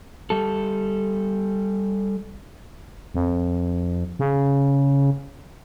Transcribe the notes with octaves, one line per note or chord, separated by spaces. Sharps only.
G3 A4
F2
C#3